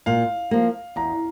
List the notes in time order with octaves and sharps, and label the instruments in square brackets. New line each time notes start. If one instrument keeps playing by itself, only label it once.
[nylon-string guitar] A#2 [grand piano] F5
[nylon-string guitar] F3 A#3
[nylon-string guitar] E2 [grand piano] A#5